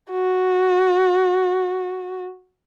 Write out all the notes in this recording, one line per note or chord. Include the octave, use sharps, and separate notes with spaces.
F#4